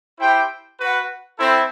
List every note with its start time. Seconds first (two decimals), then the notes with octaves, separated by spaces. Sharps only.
0.18 E4 G4 C5 G5
0.78 F#4 B4 F#5
1.37 C4 E4 A4 C5